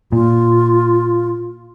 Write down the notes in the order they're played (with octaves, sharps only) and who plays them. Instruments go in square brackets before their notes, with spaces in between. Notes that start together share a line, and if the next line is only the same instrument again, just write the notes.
[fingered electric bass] A#2 [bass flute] F4